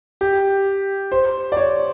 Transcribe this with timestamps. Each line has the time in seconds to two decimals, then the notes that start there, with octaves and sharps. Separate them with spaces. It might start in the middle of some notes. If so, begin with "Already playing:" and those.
0.21 G4
1.12 C5
1.52 D5
1.57 C#5